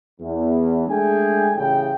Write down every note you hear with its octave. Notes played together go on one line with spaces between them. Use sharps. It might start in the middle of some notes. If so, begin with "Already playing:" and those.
E2
G#3 A3 D4 G#4 G5 G#5
A1 C#3 E4 G5